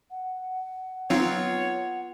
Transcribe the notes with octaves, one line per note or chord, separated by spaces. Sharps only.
F#5
F#3 B3 C4 D#4 F4 C#5